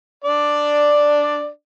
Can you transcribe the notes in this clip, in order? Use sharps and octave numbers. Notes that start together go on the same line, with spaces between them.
D4 D5